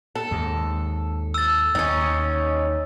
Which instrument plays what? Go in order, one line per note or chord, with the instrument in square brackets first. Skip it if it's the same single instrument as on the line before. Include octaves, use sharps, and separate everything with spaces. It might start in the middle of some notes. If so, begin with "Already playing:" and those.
[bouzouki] A4
[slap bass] D#2 G#2
[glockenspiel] E6 A6
[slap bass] D#2 [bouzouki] C#4 D#4 [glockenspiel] A6